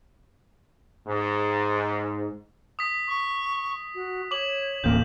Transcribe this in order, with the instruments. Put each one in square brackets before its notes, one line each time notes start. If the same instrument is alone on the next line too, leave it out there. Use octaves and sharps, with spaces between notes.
[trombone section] G#2
[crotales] D#6 B6
[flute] C#6
F#4
[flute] C#5 [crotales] D6 F#7
[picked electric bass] D1 A1 A#3 [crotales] G6